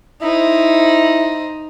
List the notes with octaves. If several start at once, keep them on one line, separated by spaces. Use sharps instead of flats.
D#4 E4 C5